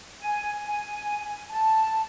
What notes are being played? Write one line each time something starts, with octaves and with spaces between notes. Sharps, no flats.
G#5
G#5
A5